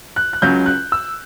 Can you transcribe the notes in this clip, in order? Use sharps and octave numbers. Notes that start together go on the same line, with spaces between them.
F#6
F#6
C#2 C#3 F#3 G6
F#6
E6